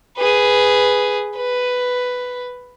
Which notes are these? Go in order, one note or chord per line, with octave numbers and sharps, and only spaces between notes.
G#4 B4
B4